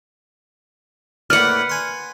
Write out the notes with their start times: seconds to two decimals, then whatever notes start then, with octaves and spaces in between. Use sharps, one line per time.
1.30 A2 A#3 B4 D5 F#5 F6
1.69 G#5 C6